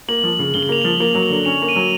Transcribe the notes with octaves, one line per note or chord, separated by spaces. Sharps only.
A#3 F#7
F3
C#3
C#3 G7
F#7
A#3 F7
F#7
F3
A#3
F#3
F#7
D3
C#4 F7
A#3
D#7
F#3